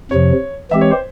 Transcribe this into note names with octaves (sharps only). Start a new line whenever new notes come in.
F2 C3 F3 C#5
E3 G#3 C4 G4 E5
C#5
C5